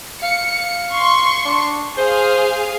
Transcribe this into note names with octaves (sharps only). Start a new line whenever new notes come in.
F5 C#7
C6 C#6
D4
G#4 C5 F5